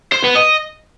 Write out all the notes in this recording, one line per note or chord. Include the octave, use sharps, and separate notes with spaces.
C5
B3
D#5